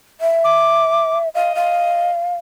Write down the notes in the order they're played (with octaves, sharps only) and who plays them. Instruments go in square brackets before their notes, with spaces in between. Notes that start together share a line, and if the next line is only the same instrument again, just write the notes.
[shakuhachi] E5
[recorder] D6
[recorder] D#5 [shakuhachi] F5
[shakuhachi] F5